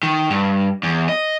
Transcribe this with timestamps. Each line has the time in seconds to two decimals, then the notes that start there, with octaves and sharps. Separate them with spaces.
0.03 D#3
0.30 G2
0.83 E2
1.09 D#5